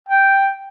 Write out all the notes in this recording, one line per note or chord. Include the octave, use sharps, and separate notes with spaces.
G5